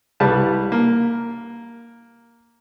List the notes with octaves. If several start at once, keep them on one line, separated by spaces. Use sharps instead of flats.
C2 G3 B4 F5 A5
A#3